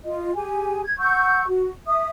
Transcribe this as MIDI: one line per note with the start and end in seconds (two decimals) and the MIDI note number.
0.04 0.34 65
0.04 0.34 75
0.35 0.82 67
0.35 0.82 68
0.35 0.82 80
0.85 0.96 92
0.99 1.46 78
0.99 1.46 85
0.99 1.46 88
0.99 1.46 91
1.47 1.72 66
1.87 2.09 76
1.87 2.09 87